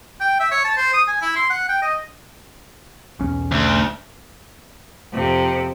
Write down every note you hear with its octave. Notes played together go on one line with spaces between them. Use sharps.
G5
E5
C#5
A5
C5
D#6
G#5
E4
C6
F#5
G5
D#5
B1 E2 C#4
D2
F2 C3